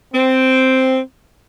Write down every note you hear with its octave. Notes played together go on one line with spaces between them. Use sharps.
C4